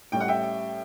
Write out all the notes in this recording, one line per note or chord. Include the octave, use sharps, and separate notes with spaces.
A2 G3 C#4 G5
F#5
E5 G5